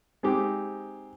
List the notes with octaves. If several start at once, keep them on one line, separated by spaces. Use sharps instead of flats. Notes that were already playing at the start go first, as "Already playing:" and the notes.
G#3 C4 D#4 G4